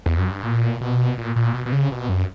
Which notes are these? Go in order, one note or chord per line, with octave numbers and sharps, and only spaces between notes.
E2
F#2
G2
A#2
B2
A#2
A#2
B2
B2
C#3
B2
F#2